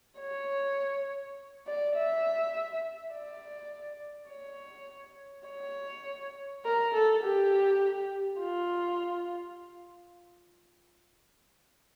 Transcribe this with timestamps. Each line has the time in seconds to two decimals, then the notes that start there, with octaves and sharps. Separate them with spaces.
0.20 C#5
1.67 D5
1.96 E5
3.13 D5
4.30 C#5
5.48 C#5
6.65 A#4
6.94 A4
7.23 G4
8.40 F4